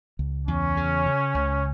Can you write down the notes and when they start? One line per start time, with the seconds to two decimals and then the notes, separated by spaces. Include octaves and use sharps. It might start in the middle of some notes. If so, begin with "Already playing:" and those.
0.19 C#2
0.48 E2 C#4
0.77 C#3
1.06 C#3
1.34 C#2